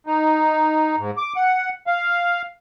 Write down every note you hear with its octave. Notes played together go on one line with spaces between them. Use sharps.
D#4
G#2
D6
F#5
F5